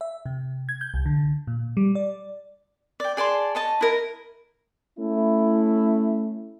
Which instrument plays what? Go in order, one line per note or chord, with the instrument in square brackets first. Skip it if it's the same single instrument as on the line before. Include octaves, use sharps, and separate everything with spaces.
[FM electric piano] E5
C3
G#6
G6
C2
D3
A#2
G3
D5
[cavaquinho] D5 G5
G#4 D5 A5 C6
C#5 D#5 A5
E4 A#4
[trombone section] A3 C#4 E4